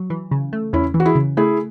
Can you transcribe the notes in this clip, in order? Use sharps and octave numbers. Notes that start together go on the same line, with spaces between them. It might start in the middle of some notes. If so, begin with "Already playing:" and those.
Already playing: F#3
E3
C#3
A3
E2 C#4 E4
E3
F#4
E4 G#4
C#3
A3 E4 G#4